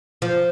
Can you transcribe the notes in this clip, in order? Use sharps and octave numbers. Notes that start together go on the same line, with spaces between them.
F3